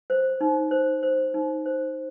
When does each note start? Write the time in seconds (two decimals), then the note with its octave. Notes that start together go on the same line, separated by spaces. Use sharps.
0.10 C5
0.41 D#4
0.71 C5
1.03 C5
1.34 D#4
1.66 C5